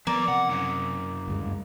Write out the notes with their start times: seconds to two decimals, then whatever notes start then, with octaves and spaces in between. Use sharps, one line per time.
0.07 F3 A#3 B3 D5
0.28 C3 F#5
0.49 F#2 C#3
1.28 D2 G2 G#3